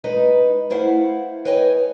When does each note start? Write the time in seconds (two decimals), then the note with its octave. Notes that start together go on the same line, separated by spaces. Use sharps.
0.04 G#3 D#4 B4 D#5
0.70 A3 E4 C5 F5 F#5
1.45 B4 C#5 D#5 G5 G#5